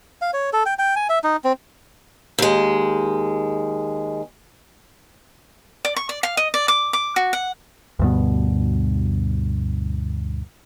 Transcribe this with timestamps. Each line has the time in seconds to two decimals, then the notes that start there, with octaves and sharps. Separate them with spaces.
0.22 F5
0.33 C#5
0.53 A4
0.66 G5
0.79 G5
0.96 G#5
1.09 E5
1.24 D#4
1.44 C4
2.38 D#2 G#3
5.85 D5
5.96 C#6
6.09 D5
6.23 F5
6.37 D#5
6.54 D5
6.68 D6
6.93 D6
7.16 F#4
7.33 F#5
7.99 D2 G2 B2